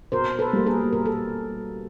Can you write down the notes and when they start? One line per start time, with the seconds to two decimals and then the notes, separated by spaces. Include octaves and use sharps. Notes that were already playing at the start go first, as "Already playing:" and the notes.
0.12 B2 A#4 C5
0.39 A4 B4
0.53 G3 A#3
0.66 G#4 A#4
0.93 B2 A#4
1.06 A4